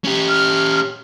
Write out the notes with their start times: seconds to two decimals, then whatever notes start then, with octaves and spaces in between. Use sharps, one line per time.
0.05 C#4 G4
0.29 F6